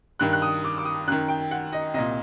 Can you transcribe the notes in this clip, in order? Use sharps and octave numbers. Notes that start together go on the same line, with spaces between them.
G2 D#3 F#6
F#6
D#6
D6
D6
D#6
F#2 D#3 F#6
G5
F#5
D#5
C2 A#2 D#5